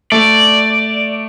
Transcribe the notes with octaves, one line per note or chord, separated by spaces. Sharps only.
A3 D5